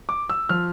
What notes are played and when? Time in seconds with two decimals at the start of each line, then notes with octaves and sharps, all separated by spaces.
0.09 D6
0.30 E6
0.49 F3 F6